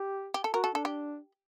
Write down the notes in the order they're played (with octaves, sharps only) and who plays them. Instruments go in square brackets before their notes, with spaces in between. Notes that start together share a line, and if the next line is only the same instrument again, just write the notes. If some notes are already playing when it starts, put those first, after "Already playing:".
Already playing: [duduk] G4
[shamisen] G4
A4
[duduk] F#4 [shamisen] A#4
[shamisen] A4
[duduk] D4 [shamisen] A4
[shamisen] G4